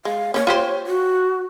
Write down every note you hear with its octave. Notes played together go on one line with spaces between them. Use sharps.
G#3 F5
A#3 C#4 C#5
F4 G4 C5
F#4